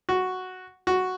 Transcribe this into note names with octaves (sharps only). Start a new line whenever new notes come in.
F#4
F#4